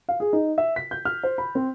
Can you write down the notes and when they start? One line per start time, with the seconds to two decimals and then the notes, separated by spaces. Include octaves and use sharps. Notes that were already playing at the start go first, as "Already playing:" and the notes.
0.09 F5
0.20 G#4
0.33 D#4
0.58 E5
0.76 B6
0.91 G6
1.05 F6
1.23 C5
1.38 B5
1.55 C4